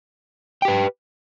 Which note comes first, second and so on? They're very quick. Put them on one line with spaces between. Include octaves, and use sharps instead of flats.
G5 G4 B4